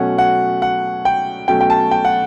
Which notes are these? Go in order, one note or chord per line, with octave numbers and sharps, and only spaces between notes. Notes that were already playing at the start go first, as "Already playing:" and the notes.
Already playing: B2 F#3 A3 C#4 F#5
F#5
F#5
G5
B2 F#3 A3 C#4 G5
G5
A5
G5
F#5